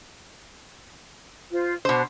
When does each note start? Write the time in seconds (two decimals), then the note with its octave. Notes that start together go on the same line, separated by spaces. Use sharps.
1.51 F4 C5
1.85 B2 D4 C5